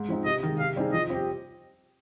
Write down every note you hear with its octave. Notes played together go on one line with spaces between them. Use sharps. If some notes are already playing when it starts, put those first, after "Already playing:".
Already playing: G#2
F3 C4 D#4
C3 D#5
D#3 G#3
C3 F5
G3 C4 D#4 G#4
F3 D#5
C4 G4